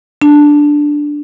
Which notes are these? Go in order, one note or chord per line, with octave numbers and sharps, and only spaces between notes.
D4